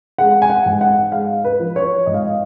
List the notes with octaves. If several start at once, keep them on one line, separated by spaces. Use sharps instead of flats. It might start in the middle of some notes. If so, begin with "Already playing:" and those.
G#3 F#5
G#5
F#5
G#2
F#5
G#3 F5
B4
F3
C#5
G#2 D#5
F5
D#5